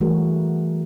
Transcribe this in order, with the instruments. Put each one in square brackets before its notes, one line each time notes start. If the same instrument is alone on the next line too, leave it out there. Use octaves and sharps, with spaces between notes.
[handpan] E3 G3 A3 F#4 G#4 A#4